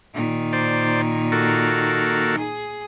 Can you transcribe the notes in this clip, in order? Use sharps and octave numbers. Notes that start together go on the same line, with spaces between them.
A#2 D#3
C5 D5
A#3 F#4 A4
G#4